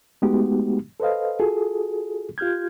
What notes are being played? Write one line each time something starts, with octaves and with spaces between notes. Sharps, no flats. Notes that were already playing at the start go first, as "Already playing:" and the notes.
G#3 A3 B3 D#4 F#4 G4
A4 B4 C5 D#5 F5
F4 F#4 G#4 A4
F4 G4 F6 G6 G#6